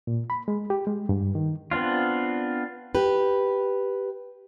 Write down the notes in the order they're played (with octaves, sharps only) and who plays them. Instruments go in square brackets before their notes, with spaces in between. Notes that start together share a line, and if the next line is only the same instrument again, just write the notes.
[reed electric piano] A#2
B5
G#3
G4
G#3
G2
D#3
[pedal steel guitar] B3 C4 D4 F4
[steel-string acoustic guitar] G4 B4